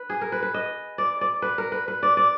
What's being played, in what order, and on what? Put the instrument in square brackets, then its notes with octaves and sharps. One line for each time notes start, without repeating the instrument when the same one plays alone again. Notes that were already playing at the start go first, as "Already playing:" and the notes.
Already playing: [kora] B4
G#4
A#4
B4
B4
D#5
D5
D5
B4
A#4
B4
B4
D5
D5